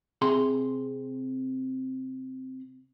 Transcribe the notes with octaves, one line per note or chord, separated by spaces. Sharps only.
C3 G#4 A#5 C6